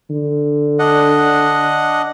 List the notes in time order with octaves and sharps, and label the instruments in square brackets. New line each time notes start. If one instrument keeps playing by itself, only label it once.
[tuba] D3
[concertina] D4 D#5 F#5